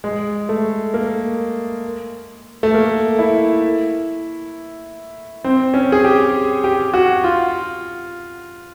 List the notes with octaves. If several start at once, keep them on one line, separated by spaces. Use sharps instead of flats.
G#3
A3
A#3
A3
A#3
E4
C4
C#4
G#4
G4
G4
F#4
F4